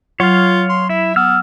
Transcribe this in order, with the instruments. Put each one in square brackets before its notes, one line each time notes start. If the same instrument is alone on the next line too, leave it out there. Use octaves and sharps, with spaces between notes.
[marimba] F#3 [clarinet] F4 [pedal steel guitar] C#5 F5
[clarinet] C6
[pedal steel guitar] E4 [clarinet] E5
[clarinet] B3 [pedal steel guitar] E6 F6